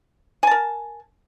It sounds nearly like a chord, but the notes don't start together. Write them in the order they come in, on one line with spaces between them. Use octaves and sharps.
G#5 A5 A#4